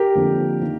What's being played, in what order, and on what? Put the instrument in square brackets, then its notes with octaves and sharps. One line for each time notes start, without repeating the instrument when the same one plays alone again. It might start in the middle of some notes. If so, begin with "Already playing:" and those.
Already playing: [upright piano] G4 A#4
[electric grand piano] F2 D3 F3 A#3
D#3 A#3